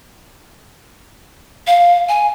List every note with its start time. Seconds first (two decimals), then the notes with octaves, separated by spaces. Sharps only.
1.67 F5
2.09 G#5